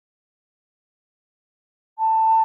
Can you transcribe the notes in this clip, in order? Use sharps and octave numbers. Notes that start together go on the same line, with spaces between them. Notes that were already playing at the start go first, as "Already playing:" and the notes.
A5